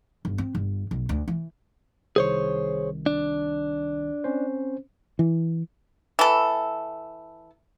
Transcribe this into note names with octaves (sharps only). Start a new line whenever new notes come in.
G1
C4
G1
B1
D2
E3
C2 D#3 G#4 C5 C#5
D4
C4 C#4 C5
E3
E3 A4